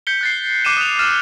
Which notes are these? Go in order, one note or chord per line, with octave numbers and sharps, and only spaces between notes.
G6 B6 C#7 G7
F#6 A6 C7
D6 F#6 C7 C#7 D#7 E7
D#6 F#6 E7 F7
E6 F6 A6 D#7 E7